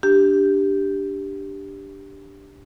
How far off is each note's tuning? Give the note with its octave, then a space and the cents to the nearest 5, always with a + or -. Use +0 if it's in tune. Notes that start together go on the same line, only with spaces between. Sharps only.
D4 +0 G4 +0